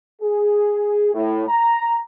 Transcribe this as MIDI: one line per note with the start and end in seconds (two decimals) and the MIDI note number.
0.22 1.10 68
1.14 1.44 45
1.49 2.00 82